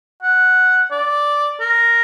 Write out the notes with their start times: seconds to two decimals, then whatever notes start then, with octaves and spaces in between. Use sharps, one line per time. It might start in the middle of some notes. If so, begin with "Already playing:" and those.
0.23 F#5
0.91 D5
1.60 A#4